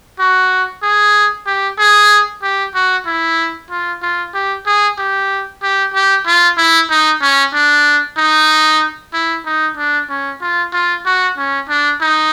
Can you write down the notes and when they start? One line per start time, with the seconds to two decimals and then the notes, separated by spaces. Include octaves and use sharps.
0.19 F#4
0.83 G#4
1.47 G4
1.79 G#4
2.43 G4
2.75 F#4
3.06 E4
3.70 F4
4.02 F4
4.34 G4
4.66 G#4
4.98 G4
5.63 G4
5.94 G4
6.26 F4
6.58 E4
6.90 D#4
7.22 C#4
7.54 D4
8.18 D#4
9.13 E4
9.46 D#4
9.77 D4
10.09 C#4
10.42 F4
10.73 F4
11.06 F#4
11.37 C#4
11.69 D4
12.01 D#4